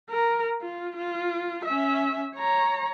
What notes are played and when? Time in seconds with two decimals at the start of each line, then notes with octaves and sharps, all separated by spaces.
0.10 A#4
0.62 F4
0.96 F4
1.65 C#4 E5
2.36 C#5 A#5